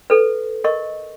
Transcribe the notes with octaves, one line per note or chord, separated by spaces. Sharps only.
A4 B4
A#4 D#5 C#6